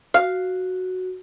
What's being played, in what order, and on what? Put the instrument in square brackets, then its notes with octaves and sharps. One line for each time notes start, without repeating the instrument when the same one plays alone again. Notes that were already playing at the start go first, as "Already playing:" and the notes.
[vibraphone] F#4 [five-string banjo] F5